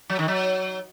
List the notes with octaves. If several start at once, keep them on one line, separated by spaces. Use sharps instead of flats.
F#3
D#3
F#3